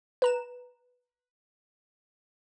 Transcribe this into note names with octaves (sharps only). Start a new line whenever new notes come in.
B4 A#5 E7